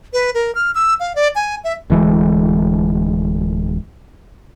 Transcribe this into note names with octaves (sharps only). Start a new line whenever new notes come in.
B4
A#4
F6
E6
F5
D5
G#5
E5
D1 E3 G#3